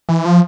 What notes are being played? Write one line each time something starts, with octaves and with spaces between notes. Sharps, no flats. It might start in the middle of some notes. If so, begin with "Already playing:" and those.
E3
F3